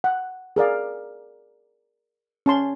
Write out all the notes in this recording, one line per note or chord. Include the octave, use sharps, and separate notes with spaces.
F#5
G#4 A#4 D5 F5
C#4 A5 C6